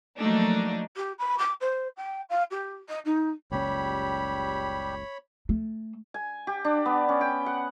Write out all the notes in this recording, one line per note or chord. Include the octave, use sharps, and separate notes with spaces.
F3 F#3 A3 A#3 D4 D#4
G4
B5
D6
C5
G5
F5
G4
D#5
D#4
F#1 C#2 G3 C#4 G4 C#5 B5
A3
G#5
G4
D4
B3
C#4
G5
F#5